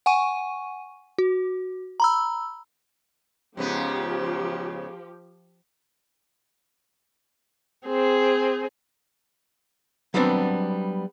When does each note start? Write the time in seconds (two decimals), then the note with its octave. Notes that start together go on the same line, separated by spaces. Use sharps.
0.06 F#5 G#5 C#6 D#7
1.18 F#4
2.00 A#5 B5 E6
3.57 G#2 C#3 F3 B3 G4
7.86 C4 G#4
10.14 F#3 G3 B3 C4 D4